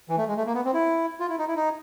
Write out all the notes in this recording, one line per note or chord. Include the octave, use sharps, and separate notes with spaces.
E3
A3
G#3
A3
A#3
B3
C4
E4
F4
E4
D#4
E4
D#4